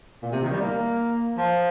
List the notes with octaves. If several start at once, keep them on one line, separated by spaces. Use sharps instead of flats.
A#2
C3
D#3
G3
A#3
F3